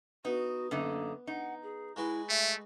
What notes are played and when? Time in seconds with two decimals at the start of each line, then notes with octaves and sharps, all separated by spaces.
0.25 B3 D#4 F#4
0.71 F#2 D3 A#3 D#4
1.27 D#4 F#5
1.63 G#4
1.96 G#3 E4 F#4 B4
2.29 A3 E5